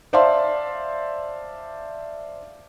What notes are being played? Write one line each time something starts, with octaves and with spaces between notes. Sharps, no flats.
C5 D5 E5 F5 A5 C6